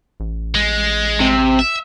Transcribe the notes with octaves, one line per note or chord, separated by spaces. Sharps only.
A1
G#3
C3
E5